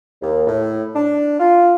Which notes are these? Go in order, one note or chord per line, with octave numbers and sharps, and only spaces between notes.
D#2
A2
D4
F4